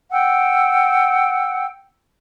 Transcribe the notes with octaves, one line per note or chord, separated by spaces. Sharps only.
F#5 G5 E6